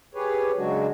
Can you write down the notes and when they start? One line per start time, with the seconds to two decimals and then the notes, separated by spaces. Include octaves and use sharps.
0.14 G4 G#4 B4 C#5
0.57 C#3 F#3 G#3 D4 F#4